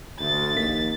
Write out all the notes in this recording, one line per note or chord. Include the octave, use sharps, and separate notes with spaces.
D2 A6
A#1 D#2 A#3 B6